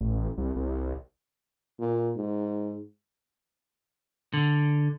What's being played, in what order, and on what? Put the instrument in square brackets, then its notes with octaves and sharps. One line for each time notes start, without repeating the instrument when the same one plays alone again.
[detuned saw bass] A1
C2
C2
[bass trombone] A#2
G#2
[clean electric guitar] D3